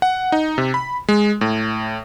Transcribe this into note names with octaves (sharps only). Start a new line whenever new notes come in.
F#5
D#4
C3
B5
G#3
A2